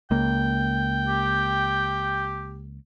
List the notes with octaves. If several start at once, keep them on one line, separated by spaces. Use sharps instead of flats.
C#2 A#3 G5
G4